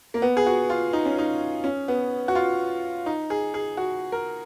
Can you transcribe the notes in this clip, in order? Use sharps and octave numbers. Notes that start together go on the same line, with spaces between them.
A#3
B3
G#4
F#4
F4
D#4
C#4
D#4
C#4
B3
F#4
F4
D#4
G#4
G#4
F#4
A#4